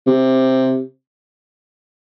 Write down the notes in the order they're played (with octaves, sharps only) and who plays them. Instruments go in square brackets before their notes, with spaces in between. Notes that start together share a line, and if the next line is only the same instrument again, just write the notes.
[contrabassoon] C3